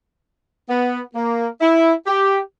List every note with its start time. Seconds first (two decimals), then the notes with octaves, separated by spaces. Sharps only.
0.69 B3
1.15 A#3
1.61 E4
2.06 G4